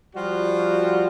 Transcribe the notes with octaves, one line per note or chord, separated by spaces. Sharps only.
F3 G3 F4 F#4